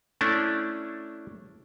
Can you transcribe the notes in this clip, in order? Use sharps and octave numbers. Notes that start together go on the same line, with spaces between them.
A3 C#4 D4 E4